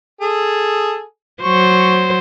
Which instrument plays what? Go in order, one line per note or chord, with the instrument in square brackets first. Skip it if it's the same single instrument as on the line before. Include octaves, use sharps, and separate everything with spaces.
[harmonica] G#4 A4
[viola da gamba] F#3 C5 [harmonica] C#6